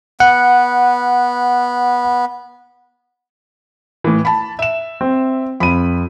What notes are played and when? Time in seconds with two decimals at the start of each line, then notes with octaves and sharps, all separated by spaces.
0.20 B3 F#5
4.04 A2 E3
4.25 A5 B5
4.59 E5 E7
5.01 C4
5.60 F2 B5 D#7